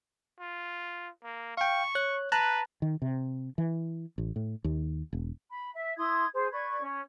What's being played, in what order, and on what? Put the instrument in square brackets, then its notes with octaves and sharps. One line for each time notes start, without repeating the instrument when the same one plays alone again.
[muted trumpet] F4
A#3
[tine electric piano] F5 G5 [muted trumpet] C#6
[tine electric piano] C#5 F#6
[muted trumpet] B4 [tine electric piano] A5 A#5 F#6
[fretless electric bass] D#3
C3
E3
A1
A2
D#2
E1
[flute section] B5
E5
E4 C6 D#6 G#6
G#4 C5
B4 D5 C#6 G#6
C#4